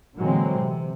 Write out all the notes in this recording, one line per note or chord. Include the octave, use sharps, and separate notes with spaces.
A#2 D3 E3 F#3 G#3 C4
C3